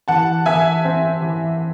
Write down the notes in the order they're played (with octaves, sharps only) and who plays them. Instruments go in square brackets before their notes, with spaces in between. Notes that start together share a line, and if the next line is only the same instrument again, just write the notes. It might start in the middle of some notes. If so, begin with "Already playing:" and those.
[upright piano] E3 F#5 A5
E3 E5 G#5
C4
E3